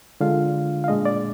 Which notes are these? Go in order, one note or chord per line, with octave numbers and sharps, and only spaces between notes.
D3 G#3 D4 F4 F5
F5
A#2 G#3 D4 D#5
D5